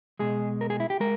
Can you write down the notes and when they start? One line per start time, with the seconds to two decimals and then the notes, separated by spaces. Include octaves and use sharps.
0.19 B2 G#3 G#4
0.61 A#4
0.70 G#4
0.80 E4
0.90 G4
1.00 G#3 A#4